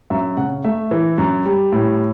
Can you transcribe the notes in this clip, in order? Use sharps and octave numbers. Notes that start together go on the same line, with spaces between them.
F#2 E5
C#3 F#5
A3 E5
E3
F#2
G3
A2